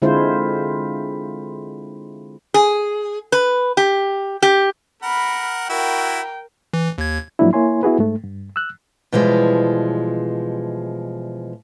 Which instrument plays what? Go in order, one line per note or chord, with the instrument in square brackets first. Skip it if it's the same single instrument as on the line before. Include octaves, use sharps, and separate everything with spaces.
[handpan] D3 G#3 C4 E4 F4 C5
[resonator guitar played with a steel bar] G#4
B4
G4
G4
[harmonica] A#4 F#5 [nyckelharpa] B5
[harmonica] E4 F#4 [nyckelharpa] A#4 [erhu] G5
[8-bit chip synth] E3
D#2 G#6
[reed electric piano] G#2 F3 F#3 A#3 D4 E4
A#3 E4 C#5 G#5 C6
B3 E4 F#4 G#4 B4
G#2 A3
G2
E6 F#6
[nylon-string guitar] B2 E3 F3 G3 G#3